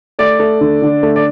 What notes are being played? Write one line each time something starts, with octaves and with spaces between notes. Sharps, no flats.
A3 D5
A3
D3
D3
A3
D5